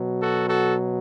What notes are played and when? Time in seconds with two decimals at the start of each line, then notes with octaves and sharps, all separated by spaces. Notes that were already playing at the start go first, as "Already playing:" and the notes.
Already playing: B2 F#3
0.21 F#4 A4
0.50 F#4 A4